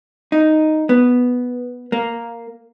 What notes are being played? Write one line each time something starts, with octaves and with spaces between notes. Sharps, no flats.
D#4
B3
A#3